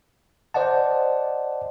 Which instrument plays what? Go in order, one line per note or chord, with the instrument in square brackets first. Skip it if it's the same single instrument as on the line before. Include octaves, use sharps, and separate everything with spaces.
[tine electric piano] C5 D5 D#5 F#5 A5